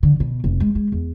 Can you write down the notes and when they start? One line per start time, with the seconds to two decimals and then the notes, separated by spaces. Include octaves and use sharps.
0.03 D3
0.20 B2
0.44 F1
0.60 G#3
0.75 G#3
0.92 E2